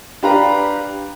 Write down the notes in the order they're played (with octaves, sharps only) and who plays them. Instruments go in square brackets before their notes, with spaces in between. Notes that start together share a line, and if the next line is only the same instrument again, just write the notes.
[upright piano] D4 G4 B4 F5 A#5